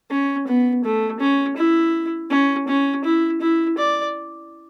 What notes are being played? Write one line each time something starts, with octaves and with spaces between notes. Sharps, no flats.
C#4
B3
A3
C#4
E4
C#4
C#4
E4
E4
D5